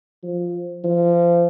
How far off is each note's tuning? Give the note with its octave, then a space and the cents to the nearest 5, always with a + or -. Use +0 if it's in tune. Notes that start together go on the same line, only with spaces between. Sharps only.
F3 +5
F3 -25